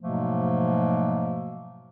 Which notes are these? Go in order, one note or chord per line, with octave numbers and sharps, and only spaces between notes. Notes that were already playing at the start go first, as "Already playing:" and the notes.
G#2 B2 F3 F#3 A3 A#3